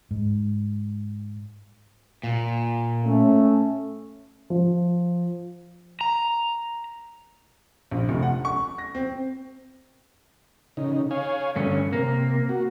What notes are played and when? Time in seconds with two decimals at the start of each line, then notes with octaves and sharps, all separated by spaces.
0.11 G#2
2.23 A#2
3.04 A3 C#4
4.50 F3
6.01 A#5
7.91 A#1
8.09 F1
8.22 F#5
8.45 C#6
8.78 A#6
8.95 C4
10.77 C#3 D#4
11.11 C#5 F5 G#5
11.56 G2 D3 A3 C#4
11.93 C3 A#3
12.49 F#4